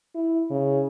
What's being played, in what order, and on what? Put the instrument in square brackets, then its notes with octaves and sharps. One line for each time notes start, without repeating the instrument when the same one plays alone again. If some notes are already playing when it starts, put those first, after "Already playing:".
[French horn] E4
C#3